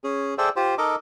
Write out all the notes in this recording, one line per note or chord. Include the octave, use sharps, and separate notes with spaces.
C#4 G#4
G#4 A4 C5 D5 E5 G5
F4 G4 C5
D#4 A4 A#4 D#5 D6